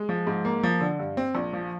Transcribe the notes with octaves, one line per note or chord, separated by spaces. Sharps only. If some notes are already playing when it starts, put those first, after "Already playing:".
Already playing: G#3
F3
G#2
A#3
F3
D3
G2
C4
A#1
F3